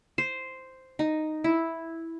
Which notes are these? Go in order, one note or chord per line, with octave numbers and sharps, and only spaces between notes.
C5
D#4
E4